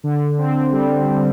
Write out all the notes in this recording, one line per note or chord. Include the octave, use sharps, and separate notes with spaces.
D3
C4
G3
D3